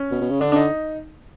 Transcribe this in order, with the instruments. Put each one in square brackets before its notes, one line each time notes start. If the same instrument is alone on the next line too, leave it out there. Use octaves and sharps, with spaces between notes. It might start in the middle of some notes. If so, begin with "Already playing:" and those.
Already playing: [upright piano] C#4
[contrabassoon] B2
B2
C#3
[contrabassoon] D3 [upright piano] D4
[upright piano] D4
D#4